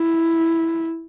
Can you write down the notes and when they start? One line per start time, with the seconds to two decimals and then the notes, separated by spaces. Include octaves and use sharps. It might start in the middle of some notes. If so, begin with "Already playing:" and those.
Already playing: E4